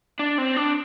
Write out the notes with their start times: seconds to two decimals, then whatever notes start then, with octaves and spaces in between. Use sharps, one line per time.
0.19 D4
0.38 C4
0.57 D4